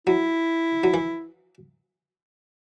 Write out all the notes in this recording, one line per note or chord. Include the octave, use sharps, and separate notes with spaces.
F#3 E4
F#3
E3